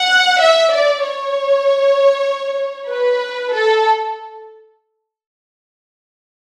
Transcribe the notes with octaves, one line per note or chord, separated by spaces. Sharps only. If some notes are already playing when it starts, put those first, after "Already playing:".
Already playing: F#5
E5
D5
C#5
B4
A4